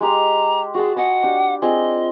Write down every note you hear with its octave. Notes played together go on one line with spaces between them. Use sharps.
G#3 G4 A#5 C6
F#4 G#4 A5
D#5 F#5 G#5 B5
D4 G4
C4 F4 G#4 D#5